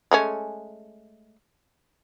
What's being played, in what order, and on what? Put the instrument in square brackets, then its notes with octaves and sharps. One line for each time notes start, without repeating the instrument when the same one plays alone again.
[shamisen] G#3 A3 C#4